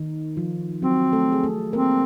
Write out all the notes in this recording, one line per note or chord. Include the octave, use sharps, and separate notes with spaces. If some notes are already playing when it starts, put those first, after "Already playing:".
Already playing: D#3 D#4
F3 F4
F#3 C4 F#4
A3 A4
G#4
A3 A4
A#3 C4 A#4